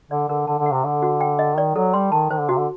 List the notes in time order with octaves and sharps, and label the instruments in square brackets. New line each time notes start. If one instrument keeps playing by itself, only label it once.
[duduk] D3 [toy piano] D5
[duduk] D3 [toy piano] A#4
[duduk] D3 [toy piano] A5
[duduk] D3
[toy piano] F#5
[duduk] C3
[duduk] D3 [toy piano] A4
[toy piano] F#4
G5
D#5
[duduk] D#3 [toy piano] D5
[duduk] F#3 [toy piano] A4
[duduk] G3 [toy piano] C6
[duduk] D#3 [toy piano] A5
[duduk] D#3 [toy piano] C5
[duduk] D3
[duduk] C3 [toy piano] F#4
[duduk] D3